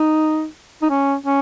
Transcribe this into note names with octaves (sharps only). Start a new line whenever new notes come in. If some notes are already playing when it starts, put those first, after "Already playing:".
Already playing: D#4
D#4
C#4
C#4